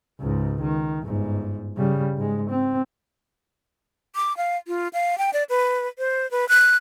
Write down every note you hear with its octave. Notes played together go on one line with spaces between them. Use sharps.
C#2 G#2
D#3
G1 G#2
C#3 G3
G#2 G#3
C4
D6
F5
F4
F5
G5
D5
B4
C5
B4
F#6